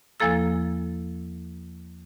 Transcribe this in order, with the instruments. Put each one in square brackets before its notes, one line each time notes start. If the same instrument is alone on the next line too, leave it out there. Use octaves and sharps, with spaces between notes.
[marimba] E2 F3 A#3 A4 E6